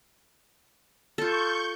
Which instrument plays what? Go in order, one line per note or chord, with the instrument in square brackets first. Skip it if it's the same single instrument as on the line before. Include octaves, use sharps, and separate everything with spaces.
[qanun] F4 A4 [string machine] C#6 G6